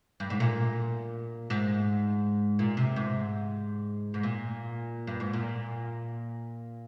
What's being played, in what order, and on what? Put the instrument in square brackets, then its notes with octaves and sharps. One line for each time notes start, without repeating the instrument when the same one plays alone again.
[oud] G2
G#2
A#2
G#2
A#2
C3
G#2
G#2
A#2
G2
G#2
A#2